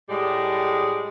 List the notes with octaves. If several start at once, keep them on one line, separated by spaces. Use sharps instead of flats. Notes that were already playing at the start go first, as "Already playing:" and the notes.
A2 G3 G#3